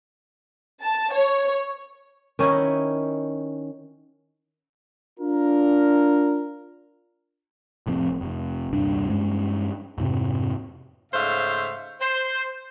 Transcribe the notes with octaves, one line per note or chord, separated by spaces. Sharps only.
A5
C#5
D#3 C#4 D#4 E4
D4 F4 A#4
F1 A2 F3 C4
F1
D#1 C2 G2 D4
G2 G#3 C#4
F2 G#2 C3
G#2 C#3 A3 C5 E5 F5
C5